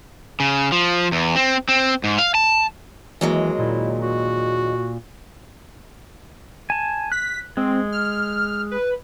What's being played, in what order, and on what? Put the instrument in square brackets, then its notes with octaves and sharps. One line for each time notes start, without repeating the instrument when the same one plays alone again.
[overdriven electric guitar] C#3
F3
E2
C4
C4
G#2
F5
A5
[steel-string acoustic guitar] D#2 F#3 G#3 [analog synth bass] E3
[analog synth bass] A#2 [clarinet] E4
[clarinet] F#4
[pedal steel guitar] G#5 A5
[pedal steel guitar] F#6 [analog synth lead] B6
[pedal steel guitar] G#3 [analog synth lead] C4
[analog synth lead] F6
B4